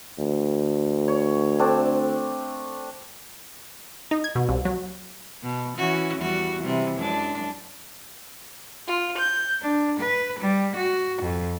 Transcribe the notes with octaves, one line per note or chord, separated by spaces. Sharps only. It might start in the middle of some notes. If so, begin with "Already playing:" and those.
D2
C#5
A3 C4 D4
D#4
G#6
B2
C2
F#3
B2
E3 C#4 F#4
E2 G3 F#4
C3 E3 G3
F#2 G#3 D4
F4
G6
D4
B4
G3
F#4
F2